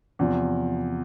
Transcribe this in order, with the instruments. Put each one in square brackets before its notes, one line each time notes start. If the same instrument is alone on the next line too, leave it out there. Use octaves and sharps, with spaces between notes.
[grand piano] E2 C3 F3